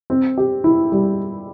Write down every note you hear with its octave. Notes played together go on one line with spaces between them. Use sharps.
C4
G4
E4
G3